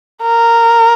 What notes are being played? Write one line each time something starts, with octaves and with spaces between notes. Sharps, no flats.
A#4